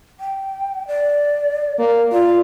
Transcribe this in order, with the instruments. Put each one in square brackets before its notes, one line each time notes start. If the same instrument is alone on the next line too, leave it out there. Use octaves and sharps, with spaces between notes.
[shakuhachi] G5
D5
[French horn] A#3
[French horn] F4 [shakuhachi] D5